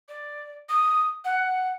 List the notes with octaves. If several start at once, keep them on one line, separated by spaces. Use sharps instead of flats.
D5
D#6
F#5